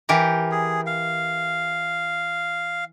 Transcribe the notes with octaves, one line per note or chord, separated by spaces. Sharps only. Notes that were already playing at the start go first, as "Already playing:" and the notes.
E3 G4 A#4
G#4
F5